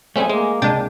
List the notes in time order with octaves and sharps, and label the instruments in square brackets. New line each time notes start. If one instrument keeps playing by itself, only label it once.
[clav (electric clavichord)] G3 C4 C#4 [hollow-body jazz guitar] A3 G#4
[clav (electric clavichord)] G#3 [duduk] A#3
[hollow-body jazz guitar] C#2 C3 [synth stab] G#3 D4 [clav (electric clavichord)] G5 A5